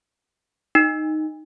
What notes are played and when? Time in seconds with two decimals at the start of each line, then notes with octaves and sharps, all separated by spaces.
0.75 D#4